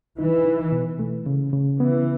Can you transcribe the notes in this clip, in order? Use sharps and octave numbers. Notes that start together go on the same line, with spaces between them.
E3 D#4
D#4
B2
A3
C#3
C#3
E3 B3